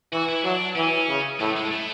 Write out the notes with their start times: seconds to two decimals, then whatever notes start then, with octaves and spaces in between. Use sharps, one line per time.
0.12 E3 F#4
0.29 E4
0.44 F#3 D4
0.76 E3 C#4
1.09 C#3
1.40 A2 A3
1.56 G#3
1.71 A3